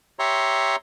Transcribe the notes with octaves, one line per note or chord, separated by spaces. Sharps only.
G4 C#5 E5 A#5 C6